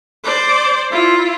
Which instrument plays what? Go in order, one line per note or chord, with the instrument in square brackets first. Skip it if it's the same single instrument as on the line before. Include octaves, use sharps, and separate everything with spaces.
[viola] C5 D5
E4 F4